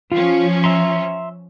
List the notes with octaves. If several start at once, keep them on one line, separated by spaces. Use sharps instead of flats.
F3 C#4 F4
E5 A#5 C6